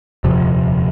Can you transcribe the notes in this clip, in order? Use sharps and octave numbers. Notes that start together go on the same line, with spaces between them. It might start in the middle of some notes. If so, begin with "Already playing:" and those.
D#1 F2 C3 F3